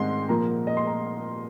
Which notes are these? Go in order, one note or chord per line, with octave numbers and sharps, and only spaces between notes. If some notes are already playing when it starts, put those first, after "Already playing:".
Already playing: G#2 D#3 G#3 C4 C6
A#2 F3 A#3 A#5
D#5
C6
A#5